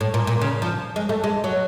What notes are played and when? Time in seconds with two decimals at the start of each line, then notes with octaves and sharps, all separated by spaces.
0.01 A2
0.14 A#2
0.27 A#2
0.41 C#3
0.62 F3
0.96 G#3
1.09 A3
1.24 G#3
1.44 F#3